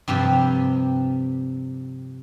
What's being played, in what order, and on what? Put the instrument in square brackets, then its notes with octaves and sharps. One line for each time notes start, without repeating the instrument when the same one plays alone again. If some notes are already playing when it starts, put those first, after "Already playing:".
[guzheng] G2 C3 F3 G4